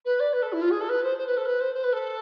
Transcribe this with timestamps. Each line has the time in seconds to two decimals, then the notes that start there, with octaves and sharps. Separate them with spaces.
0.05 B4
0.19 D5
0.33 B4
0.42 A4
0.52 E4
0.61 F4
0.71 G#4
0.80 A4
0.89 B4
1.03 C5
1.18 C5
1.26 B4
1.37 A4
1.45 B4
1.60 C5
1.74 C5
1.83 B4
1.92 A4